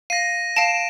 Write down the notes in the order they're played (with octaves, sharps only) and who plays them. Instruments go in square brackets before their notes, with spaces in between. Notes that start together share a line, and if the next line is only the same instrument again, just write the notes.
[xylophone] F5 [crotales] A#6 D#7
[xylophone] F5 A5 [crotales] D7 E7